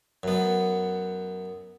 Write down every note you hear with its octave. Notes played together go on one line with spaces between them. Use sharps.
F#2 B3